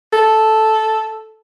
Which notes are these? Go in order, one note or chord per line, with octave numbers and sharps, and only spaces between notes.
A4